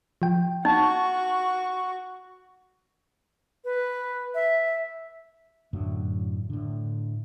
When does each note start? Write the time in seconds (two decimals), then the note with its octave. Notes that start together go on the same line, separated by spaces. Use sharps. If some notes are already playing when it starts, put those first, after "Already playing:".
0.22 F3 G5
0.65 D#4 F#4 C#6
3.65 B4
4.34 E5
5.73 F#2 A2 D3 F#3
6.50 A2 D3